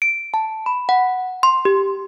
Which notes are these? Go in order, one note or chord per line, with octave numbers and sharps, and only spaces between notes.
D7
A5
B5
F#5
C6
G4